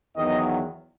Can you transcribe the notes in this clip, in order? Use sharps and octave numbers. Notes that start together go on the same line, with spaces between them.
E2 D#3 F#3 B3 D#5